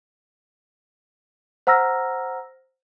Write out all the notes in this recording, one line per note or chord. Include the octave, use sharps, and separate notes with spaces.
C5 F#5 A#5 E6 F6 A#6